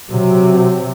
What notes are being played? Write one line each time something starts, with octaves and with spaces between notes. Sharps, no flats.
C3 F#3